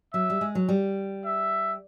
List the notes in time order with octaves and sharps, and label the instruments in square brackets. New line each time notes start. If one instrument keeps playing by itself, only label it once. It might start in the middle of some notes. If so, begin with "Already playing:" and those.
[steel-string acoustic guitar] F#3 [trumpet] E5
[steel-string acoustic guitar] G3
G#3
F#3
G3
[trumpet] E5